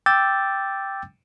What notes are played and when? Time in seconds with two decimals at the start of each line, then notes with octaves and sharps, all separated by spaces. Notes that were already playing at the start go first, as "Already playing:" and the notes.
0.06 G5 D6 E6 G6 A6